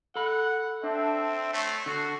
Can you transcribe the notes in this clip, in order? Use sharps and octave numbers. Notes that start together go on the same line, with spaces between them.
A4 F#5 B5
C4 D4 E5
A3 C#5 C7
D3 F#4